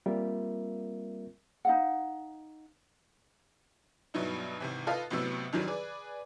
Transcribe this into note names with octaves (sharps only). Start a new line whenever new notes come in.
G3 A#3 C4 F4 A#4 E5
D#4 F5 F#5
G2 B2 F#3 B3 D#4 E4
G#1 C3 E3
F4 A4 B4 D#5 F5
A1 A2 C3 F#3 B3 E6
F#2 D#3 E3 F#3 G3
G#4 B4 D5